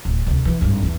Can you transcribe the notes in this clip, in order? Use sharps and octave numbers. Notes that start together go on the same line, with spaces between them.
D1
D2 C3
E3
G#1 G2
E2